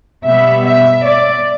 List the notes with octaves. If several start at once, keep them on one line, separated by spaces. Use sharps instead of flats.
B2 G3 B3 E5
E5
D5